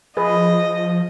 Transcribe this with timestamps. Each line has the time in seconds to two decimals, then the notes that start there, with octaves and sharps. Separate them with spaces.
0.17 F3 G#4 B4 D#5